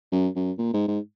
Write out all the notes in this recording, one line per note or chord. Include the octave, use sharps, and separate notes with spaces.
F#2
F#2
A#2
G#2
G#2